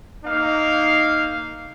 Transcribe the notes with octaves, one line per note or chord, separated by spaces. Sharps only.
A#3 D#4 F5